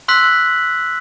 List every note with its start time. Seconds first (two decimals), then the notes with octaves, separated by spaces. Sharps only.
0.08 C6 E6 F#6 B6 F#7